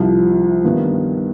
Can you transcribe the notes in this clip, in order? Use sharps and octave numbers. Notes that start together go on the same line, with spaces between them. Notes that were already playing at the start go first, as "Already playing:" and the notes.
Already playing: C2 C3 F3 C4
G2 D#3 B3